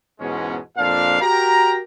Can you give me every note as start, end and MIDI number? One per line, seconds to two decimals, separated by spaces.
0.20 0.56 40
0.20 0.56 44
0.20 0.56 47
0.20 0.56 56
0.20 0.56 61
0.77 1.18 41
0.77 1.18 46
0.77 1.18 62
0.77 1.18 77
1.21 1.79 66
1.21 1.79 67
1.21 1.79 70
1.21 1.79 79
1.21 1.79 82